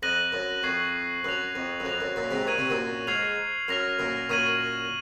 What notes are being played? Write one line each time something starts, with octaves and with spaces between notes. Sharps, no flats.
F2 F#6 A#6 D#7 F#7
F#2
F2 C#6 G#6 C7 F#7
F#2 F#6 A#6 F7
F2
F#2
F2 F#6 A#6 F7
F#2
F#2 A#2
G#2 C3
A#2 C#6 G#6 D#7 F#7
C3
F#2 A#2
G#2 F6 G#6 C7 F7
F#2 F6 A#6 F7
F#2 A#2
F#2 A#2 C#6 G#6 D#7 F#7